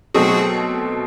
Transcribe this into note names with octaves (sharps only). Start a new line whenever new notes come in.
B2 F#3 A3 C4 F#4 G#4